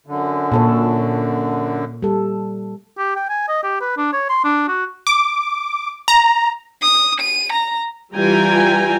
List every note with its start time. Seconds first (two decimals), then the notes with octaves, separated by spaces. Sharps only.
0.06 F#2 D3
0.52 A#2 A4 C#5
2.03 G3 A4
2.98 G4
3.16 G5
3.29 G#5
3.49 D#5
3.63 G4
3.81 B4
3.98 D4
4.13 C#5
4.29 C6
4.44 D4
4.68 F#4
5.07 D6
6.08 A#5
6.82 D#6
7.20 D#7
7.52 A#5
8.16 E3 G3 F4 G5 G#5 A#5